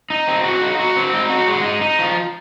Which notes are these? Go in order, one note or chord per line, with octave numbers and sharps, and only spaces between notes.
D#4
C4
F#4
D#4
F#4
C4
D#4
F#4
G#3
D#4
D#4
F3